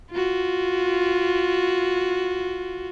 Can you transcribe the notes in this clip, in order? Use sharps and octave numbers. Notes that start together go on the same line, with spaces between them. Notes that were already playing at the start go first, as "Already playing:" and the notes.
F4 F#4